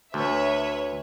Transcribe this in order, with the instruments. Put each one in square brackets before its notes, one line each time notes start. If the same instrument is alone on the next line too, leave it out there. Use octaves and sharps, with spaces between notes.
[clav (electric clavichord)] D2 [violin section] B4 C#5 E5